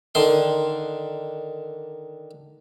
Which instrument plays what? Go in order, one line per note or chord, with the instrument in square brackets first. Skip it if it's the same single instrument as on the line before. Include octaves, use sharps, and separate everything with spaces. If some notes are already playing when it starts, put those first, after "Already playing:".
[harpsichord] D3 D#3 C6